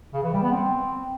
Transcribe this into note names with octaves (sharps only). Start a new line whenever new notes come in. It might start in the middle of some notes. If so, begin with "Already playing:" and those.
C#3
E3
G3
B3
C4